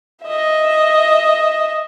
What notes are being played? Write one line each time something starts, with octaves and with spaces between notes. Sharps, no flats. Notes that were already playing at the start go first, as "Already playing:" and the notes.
D#5 E5